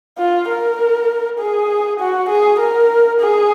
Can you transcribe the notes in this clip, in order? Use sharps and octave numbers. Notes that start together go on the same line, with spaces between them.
F4
A#4
G#4
F#4
G#4
A#4
G#4